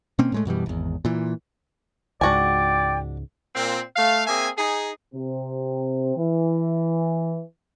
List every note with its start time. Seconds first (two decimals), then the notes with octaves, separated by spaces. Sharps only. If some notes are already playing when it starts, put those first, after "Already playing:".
0.19 B2 A#3 C4 C#4
0.32 A2 G#3 A3
0.45 F#2 B2 E3 G3
0.66 G#1 E2
1.05 A#2 E3
2.21 C#2 G#2 D4 F#4 D5 G5 G#5
3.55 A#2 C4
3.96 A3 F5
4.27 A#3 C4 G#4 E5 G#5
4.57 D#4 G#4
5.14 C3 C4
6.16 E3